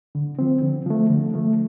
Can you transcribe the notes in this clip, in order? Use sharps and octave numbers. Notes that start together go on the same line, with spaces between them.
D3
F3 C4
D3
F3 A3
D3
F3 A3